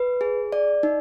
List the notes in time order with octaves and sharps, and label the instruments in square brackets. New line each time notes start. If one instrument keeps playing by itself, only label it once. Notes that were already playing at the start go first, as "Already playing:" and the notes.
Already playing: [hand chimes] B4
G#4
D5
D#4